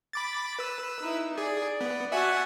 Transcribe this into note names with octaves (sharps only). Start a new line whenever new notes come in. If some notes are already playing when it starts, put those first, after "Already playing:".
B5 D6 A6
B4 E6
D#4 E4
G#4 D5
B3
F#4 E5 F#5 G#5 A5